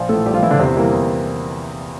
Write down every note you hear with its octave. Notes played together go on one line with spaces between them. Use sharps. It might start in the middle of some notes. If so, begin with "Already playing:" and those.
Already playing: A#1 F3 F4
A2 E3 A3 A4
A#1 G3 G4
F3 F4
A2 E3 E4
D3 D4
E2 C3 C4
E3 G3 A#3
E2